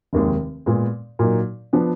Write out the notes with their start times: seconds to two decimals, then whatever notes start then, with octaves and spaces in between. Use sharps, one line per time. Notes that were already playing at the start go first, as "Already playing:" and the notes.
0.13 F1 D#2 D#3 G#3
0.66 A#2 G#3 B3
1.19 A#2 F#3 A#3 D#4
1.73 F3 B3 D4